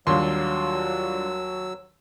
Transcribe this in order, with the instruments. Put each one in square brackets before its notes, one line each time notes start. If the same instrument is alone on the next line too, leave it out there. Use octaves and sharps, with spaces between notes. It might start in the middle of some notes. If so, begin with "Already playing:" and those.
[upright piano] D#2 C6 [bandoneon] F#3 E6 [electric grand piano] G3 D4 F4